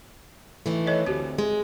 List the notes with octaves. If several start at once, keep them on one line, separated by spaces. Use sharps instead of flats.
D#3 E3 A3
A4 C#5 D#5
D2 C4 F#4 G4
G#3